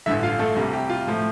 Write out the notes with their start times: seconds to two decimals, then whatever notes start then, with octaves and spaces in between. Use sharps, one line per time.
0.06 A1 G2 D3 E4 E5
0.23 F4 F5
0.39 A3 A4
0.56 C2 C3 G3
0.73 G4
0.89 F4
1.07 A2 F3 A3